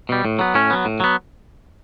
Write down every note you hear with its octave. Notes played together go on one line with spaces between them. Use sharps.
B2 G3
A2
F#3 B3
A2 C#4
F#3 B3
A2
F#3 B3